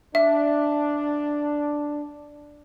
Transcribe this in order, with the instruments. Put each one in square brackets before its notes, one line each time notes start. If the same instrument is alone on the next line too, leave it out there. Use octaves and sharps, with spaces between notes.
[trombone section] D4 [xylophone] E5